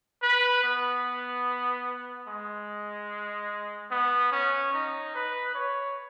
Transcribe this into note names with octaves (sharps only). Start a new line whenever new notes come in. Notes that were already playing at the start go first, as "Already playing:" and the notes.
B4
B3
G#3
B3
C#4
D#4
B4
C#5